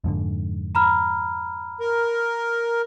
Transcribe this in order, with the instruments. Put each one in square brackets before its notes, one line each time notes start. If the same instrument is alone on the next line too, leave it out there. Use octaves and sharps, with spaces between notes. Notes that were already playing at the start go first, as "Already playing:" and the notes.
[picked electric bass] F2 G#2 D3
[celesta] A#5 B5 F6
[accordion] A#4